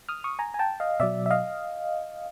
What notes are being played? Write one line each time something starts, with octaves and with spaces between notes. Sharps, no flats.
D#6 F6
C#6 D#6
G#5 A#5
G#5
G5 A5
D#5 F5
B2 F#3 D5 E5
E5
D#5 F5